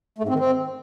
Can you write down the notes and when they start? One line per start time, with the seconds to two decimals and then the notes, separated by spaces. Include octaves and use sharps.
0.18 A3
0.24 G#2
0.29 C4
0.34 D#3
0.39 C4